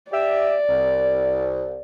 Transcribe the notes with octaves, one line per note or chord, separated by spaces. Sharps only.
G4 D5 E5
C2